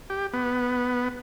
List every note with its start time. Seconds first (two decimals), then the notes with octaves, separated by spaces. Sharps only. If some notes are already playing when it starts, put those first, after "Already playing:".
0.10 G4
0.33 B3